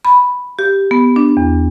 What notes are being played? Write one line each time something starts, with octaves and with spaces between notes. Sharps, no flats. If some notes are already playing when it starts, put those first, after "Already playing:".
B5
G4
B3
D4
E2